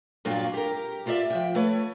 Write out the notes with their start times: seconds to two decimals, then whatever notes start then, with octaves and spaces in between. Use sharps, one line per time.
0.25 G2 A#2 F#3 D4 F4 F#4
0.54 G4 A#4
1.06 E4 F4 G4 D5 E5
1.30 F3 G5
1.55 A3 B4 C#5